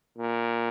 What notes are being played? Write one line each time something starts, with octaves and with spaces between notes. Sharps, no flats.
A#2